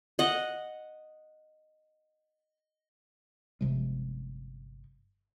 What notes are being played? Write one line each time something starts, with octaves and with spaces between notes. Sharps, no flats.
D#5 F#5
G1 C3 F3 G#3